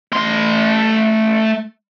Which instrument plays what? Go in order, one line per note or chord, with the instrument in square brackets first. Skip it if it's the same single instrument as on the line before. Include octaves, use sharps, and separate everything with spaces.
[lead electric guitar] A3 C6